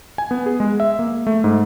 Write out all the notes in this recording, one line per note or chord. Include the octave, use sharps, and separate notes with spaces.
G#5
B3
G#4
G#3
E5
A#3
A3
G#2